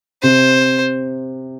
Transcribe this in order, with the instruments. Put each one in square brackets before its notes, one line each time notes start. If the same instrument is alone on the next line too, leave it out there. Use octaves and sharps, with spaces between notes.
[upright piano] C3 [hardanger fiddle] C5